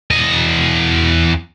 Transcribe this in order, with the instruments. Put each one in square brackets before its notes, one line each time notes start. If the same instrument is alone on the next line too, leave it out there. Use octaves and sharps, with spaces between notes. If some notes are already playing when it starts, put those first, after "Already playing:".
[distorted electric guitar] E2 D#5